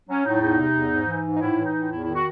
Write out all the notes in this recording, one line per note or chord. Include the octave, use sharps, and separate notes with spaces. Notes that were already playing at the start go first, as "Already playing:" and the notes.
F#3 C#4
A2 D#4
E2 D#4
C3
E2
G#2
E3
G#2
D#4
A2 E4
E3
D#4
A2
E2 E4
D#3 E4
F#4